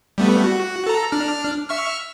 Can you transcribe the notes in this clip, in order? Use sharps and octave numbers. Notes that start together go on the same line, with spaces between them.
G3 A3 B3
F#4
A4 A#5
D4 F6
E5 C#6 F6